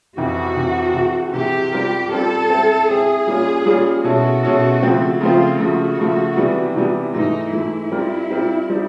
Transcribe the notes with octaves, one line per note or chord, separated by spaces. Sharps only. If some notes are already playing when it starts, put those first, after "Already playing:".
F2 C3 E3 F#4
F2 C3 E3
C3 E3 G#3
C3 E3 G#3 G4
G3 C4 F4 A#4
G3 C4 F4 A4 A#4
G#3 C4 E4
G#3 C4 E4 G#4
G3 A#3 C#4 F4
G3 A#3 C#4 F4
B2 G#3 C#4 E4 F#4 A4
B2 G#3 C#4 E4 A4
C#3 F3 A3 C4
C#3 F3 A3 C4 F4
C#3 F3 A3 F#4
C#3 F3 A3
C3 E3 G3 B3
C3 E3 G3 B3
G#2 E3 A3 D#4
G#2 E3 A3 E4
G3 C4 F4 A#4
G3 C4 F4 A#4
G3 C4 D#4